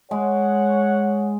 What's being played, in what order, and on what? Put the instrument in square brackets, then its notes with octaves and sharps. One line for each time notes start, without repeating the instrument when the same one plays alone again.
[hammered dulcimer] G#3 [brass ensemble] C#5 F#5